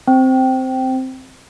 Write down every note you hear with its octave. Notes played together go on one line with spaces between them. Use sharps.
C4